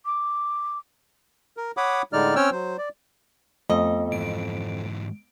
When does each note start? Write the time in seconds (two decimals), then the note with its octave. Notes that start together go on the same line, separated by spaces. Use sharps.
0.06 D6
1.57 A#4
1.77 C#5 F#5 B5 D6 D#6
2.13 A2 D3 G#3 D#4 D5 F6
2.36 C4 C#4 C#5 G5 E6 F6
2.52 F#3 C5
2.78 D5
3.70 F2 A3 B3 D#5
4.12 G#2 E3 D7